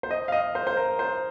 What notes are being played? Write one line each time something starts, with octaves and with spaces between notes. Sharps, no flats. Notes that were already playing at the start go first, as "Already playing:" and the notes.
C5
D#5
F5
D#5
C5
C5
A#4
C5